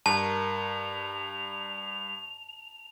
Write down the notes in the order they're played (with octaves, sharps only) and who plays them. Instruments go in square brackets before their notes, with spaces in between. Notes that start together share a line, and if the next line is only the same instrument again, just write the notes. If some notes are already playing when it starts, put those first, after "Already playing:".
[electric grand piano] G2 [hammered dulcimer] A#4 [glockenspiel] A5 [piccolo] F7